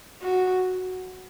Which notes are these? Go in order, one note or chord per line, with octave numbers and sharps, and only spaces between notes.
F#4